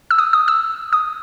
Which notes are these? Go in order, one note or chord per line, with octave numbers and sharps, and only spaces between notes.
E6
D#6
D#6
E6
D#6